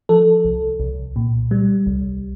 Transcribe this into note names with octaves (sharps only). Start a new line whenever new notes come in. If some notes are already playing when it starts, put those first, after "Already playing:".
F3 A4
C2
C2
A#2
G3
C2